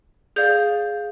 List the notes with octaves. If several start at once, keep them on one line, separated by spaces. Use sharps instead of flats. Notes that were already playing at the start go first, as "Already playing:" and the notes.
G#4 D5 F5 G6